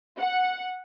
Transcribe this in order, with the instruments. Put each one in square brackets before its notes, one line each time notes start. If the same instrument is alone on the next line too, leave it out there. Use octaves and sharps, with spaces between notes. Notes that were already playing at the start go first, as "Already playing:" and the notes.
[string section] F#5